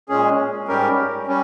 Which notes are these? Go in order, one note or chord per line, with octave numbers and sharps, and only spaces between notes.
A#2 G#3 C#4 G#4
G#2 G3 C#4 G4 A#4
G3 C#4